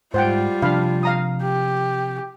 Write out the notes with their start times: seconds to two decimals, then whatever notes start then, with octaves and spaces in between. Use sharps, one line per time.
0.14 G#2 G3 F4 C5 F#5 G5
0.62 C3 F3 D4 F5 B5
1.03 F5 A#5 D#6
1.42 G4